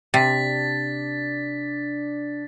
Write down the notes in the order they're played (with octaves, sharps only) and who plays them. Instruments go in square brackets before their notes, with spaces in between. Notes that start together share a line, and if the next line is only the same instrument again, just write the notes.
[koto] C3 [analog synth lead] D4 [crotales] A6 B6